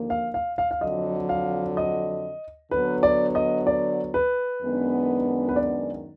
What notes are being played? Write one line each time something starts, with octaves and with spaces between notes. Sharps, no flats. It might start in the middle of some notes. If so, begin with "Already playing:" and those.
Already playing: D#2 D3 F3 A#3
F5
F5
F5
F5
F2 D3 F#3 D#5
F5
D#5
D3 F#3 B3 B4
D5
D#5
D5
B4
F#2 D#3 G#3 B3 D4
B4
D5